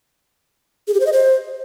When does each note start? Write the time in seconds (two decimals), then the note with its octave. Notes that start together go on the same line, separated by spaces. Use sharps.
0.88 G#4
0.94 G4
1.00 C5
1.06 D#5
1.13 C5